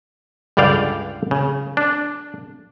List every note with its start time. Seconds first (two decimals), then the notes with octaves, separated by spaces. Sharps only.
0.57 C#2 G2 D3 D5 F5 G5
1.31 C#3
1.77 D4